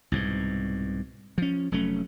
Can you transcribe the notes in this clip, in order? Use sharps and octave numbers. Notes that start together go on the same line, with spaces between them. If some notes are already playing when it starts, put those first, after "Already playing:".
C2 G#2 B2
F3 C#4
F1 F#3 A3 C#4